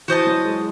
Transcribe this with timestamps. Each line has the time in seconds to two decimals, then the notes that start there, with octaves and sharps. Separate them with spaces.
0.08 E3 F#4 C5 D#5 A5
0.27 F#3
0.45 G#3